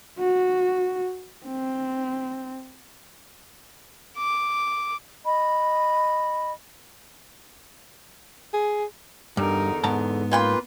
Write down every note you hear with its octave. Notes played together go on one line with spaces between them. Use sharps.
F#4
C4
D6
D#5 B5
G#4
E2 G2 D3 D#4 A#4
G#2 B3 A5 A#5
A#3 C#4 F4 B4 G5 C6